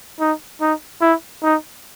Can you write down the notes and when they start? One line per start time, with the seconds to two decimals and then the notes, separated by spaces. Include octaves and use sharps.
0.20 D#4
0.61 D#4
1.01 E4
1.43 D#4